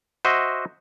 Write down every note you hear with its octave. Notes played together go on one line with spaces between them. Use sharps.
F#4 C5 D#5 E5